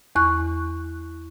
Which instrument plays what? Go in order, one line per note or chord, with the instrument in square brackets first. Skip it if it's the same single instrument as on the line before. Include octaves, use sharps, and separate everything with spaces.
[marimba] E2 C#6 F#6